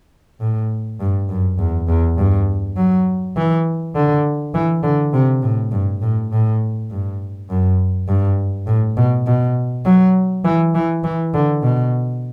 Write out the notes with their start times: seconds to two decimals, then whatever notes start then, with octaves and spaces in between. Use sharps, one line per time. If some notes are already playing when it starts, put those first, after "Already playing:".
0.40 A2
1.00 G2
1.29 F#2
1.59 E2
1.88 E2
2.18 G2
2.77 F#3
3.36 E3
3.95 D3
4.54 E3
4.84 D3
5.14 C3
5.42 A2
5.72 G2
6.02 A2
6.32 A2
6.91 G2
7.49 F#2
8.08 G2
8.67 A2
8.97 B2
9.27 B2
9.85 F#3
10.45 E3
10.75 E3
11.04 E3
11.34 D3
11.63 B2